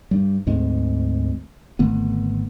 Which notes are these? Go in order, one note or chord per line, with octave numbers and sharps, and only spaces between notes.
G2 G3
D2 G#2 G#3 C4
G#1 D3 A3 B3